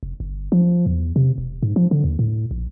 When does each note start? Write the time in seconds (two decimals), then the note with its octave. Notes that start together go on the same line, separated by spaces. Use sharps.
0.03 F1
0.20 G1
0.52 F3
0.86 E2
1.16 C3
1.38 E1
1.63 G#2
1.76 F3
1.91 D3
2.04 D#2
2.19 A2
2.51 A#1